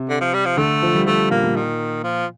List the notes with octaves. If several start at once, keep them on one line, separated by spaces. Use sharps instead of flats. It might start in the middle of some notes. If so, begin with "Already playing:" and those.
Already playing: C3
D3
F3
G3
F3
D3 A3
F3
G3
F3 A3
A#2 A#3
A#2
D#3
F3